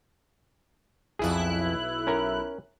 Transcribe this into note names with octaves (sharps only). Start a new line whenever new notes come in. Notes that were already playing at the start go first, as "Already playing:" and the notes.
B1 F2 E4 G#4 F#6
C#4 A#4